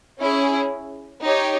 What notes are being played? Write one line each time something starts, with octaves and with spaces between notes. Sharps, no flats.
C#4 E4 G#4
D#4 G4 C#5